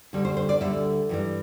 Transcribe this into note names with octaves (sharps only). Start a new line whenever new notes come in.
D2 D3 G3
C5
C5
D5
D2 D3 G3 E5
G2 E3 G3